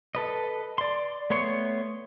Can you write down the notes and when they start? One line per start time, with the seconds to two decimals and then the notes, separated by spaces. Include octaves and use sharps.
0.15 A4 B4 D#5
0.78 D5 C6
1.30 A3 B3 C#5 C6 C#6